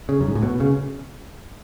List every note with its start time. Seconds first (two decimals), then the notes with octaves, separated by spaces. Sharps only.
0.09 C#3
0.21 F#2
0.28 G#2
0.35 A2
0.43 B2
0.60 C#3